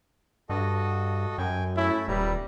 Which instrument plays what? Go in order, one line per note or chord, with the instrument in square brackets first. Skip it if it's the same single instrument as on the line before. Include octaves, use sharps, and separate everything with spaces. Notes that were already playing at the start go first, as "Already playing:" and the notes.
[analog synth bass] G2 [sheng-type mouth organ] F#4 A4 D#5
[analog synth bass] F#2 [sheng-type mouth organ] G5 G#5
[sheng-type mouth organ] A3 C#4 E5 [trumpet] E4
[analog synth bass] D#1 [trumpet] G3 [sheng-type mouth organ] B4 E5 A#5